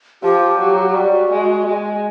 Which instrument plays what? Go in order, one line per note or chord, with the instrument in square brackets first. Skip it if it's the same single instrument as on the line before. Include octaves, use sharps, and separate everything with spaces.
[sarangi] F3 [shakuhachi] G4
[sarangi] F#3
[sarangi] G3 [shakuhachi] F#4
[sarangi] G#3
G#3